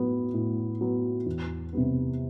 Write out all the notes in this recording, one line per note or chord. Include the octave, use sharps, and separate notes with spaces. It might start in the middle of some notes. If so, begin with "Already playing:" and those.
Already playing: A2 F#3 B3
A2
F#3 B3
E2
C3 G3 B3